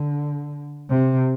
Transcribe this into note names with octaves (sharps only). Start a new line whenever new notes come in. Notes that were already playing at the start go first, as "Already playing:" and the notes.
Already playing: D3
C3